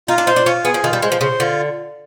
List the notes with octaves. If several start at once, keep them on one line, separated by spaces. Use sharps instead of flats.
D#4 F4
D4
D#4 C5
D4
C#4 F4
B3 G#4
F3
D#3 F4
G3
G#3 C5
F3
C#3 C5
D3 F4